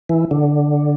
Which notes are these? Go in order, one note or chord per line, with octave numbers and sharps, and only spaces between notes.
E3
D3